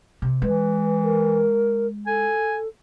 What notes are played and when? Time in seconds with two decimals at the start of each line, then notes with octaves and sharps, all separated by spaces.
0.22 C3
0.42 E3 G#3 B4
1.02 A#4
2.07 A4 G#5